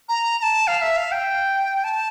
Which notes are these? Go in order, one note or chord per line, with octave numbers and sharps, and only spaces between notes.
A#5
A#5
A5
F5
E5
F5
G5
A5